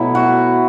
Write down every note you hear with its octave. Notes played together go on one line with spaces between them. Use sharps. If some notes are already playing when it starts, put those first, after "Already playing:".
Already playing: B2 F#3 A3 E4
F#4